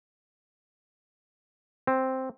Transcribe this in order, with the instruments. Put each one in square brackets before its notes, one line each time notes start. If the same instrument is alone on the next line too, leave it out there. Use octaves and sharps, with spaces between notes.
[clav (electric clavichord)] C4